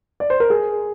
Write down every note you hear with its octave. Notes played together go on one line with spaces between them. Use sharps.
D5
C5
A#4
G#4